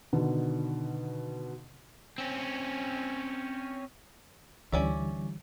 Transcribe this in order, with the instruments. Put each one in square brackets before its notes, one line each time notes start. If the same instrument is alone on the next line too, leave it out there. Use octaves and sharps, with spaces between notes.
[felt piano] B2 D3 D#3
[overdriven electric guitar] C4 C#4
[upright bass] D2 [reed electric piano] D3 E3 G3 [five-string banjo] C#4 D5 E5